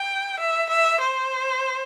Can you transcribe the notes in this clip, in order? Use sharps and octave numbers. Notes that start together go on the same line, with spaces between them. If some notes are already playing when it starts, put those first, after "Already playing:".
Already playing: G5
E5
E5
C5